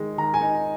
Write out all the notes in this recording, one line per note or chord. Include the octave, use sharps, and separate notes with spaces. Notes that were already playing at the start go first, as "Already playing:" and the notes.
Already playing: D#3 G#3 D#4
D#3 A#5
G#5
D#4